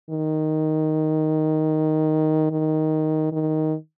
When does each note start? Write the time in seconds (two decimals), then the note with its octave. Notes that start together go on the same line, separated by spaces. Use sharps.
0.10 D#3
2.51 D#3
3.32 D#3